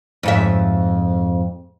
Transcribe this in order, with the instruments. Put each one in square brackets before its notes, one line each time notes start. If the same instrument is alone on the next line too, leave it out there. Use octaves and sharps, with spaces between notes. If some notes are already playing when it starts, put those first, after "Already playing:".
[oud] F2 G#2 E5